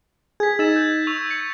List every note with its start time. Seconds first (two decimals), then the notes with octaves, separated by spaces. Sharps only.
0.40 G#4 G#6 B6
0.59 D#4 E6 A6 E7
0.76 G6
1.07 C#6 E6 F7
1.31 C#7